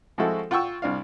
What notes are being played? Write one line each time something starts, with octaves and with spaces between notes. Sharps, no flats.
F3 G#3 C4 E4 F#4 A4
F4 F#5 G5 C#6 E6
C2 D4 F5